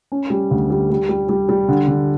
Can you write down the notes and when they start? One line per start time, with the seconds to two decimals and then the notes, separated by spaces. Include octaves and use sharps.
0.12 C#4
0.30 G3
0.51 D2
0.70 G3
0.90 G3
1.09 G3
1.29 G3
1.49 G3
1.68 D3
1.88 D3